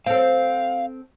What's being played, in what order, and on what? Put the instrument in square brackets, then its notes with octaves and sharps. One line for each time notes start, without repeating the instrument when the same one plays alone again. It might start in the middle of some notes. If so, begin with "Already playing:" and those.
[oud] C4 A4 [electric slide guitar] F5